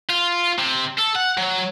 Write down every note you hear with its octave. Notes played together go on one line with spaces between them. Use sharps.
F4
C3
A4
F#5
F#3